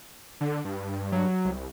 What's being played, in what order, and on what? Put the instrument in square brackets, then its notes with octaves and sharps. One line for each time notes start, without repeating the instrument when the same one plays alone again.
[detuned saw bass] D3
G2
[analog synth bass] F#3
[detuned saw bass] C2